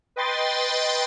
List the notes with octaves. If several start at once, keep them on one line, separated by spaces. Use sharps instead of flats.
B4 D#5 G5 C6 A6